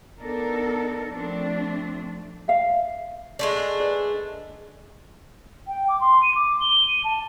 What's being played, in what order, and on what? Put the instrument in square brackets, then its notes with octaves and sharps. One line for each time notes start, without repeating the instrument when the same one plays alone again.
[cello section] B3 D4 D#4 A4 A#4
F3 A3 C4 D4
[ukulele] E5 F5
[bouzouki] G#3 A3 D4
[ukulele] B4 D5
[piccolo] G5
D6
C6
D#7
D6
G7
D#7
A5